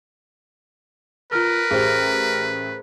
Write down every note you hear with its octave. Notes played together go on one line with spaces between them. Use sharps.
F4 A#4 B4 F6
A1 G4 G#4 C5